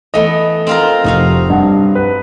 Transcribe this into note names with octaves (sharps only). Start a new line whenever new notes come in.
E3 A3 B3 D#5
C4 F4 A#4
F1 D#4 F#4 F5
G2 F#5
B4